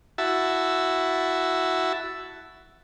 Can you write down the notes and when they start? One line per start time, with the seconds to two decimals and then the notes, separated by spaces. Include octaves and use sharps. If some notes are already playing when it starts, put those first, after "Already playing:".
0.18 E4 F#4 E5 A5